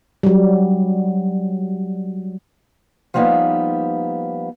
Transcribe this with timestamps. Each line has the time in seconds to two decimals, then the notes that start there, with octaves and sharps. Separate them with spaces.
0.23 F#3 G3
3.14 F3 G3 A#3 B3 D#4